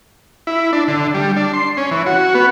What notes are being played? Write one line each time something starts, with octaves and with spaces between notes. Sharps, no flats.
E4
D4
D3
G3
D4
C6
C#4
E3
F#4
B3